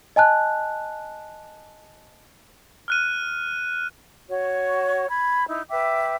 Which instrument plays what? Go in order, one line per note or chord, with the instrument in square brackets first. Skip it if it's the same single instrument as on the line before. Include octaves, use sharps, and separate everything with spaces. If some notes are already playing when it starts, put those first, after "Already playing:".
[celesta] D#5 G#5 A5 F#6
[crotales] F6 F#6 D#7
[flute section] F#4 C#5
B5 G#6
D#4 E4
B4 E5 G5 D6